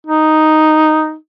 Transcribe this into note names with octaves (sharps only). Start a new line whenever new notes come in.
D#4